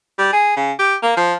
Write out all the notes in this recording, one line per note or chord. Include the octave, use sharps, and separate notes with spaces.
G3
G#4
C#3
G4
A#3
F3